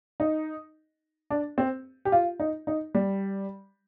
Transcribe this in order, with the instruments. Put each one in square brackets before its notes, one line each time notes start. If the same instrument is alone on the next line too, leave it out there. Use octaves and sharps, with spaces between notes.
[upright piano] D#4
D4
C4
G4
F4
D#4
D#4
G3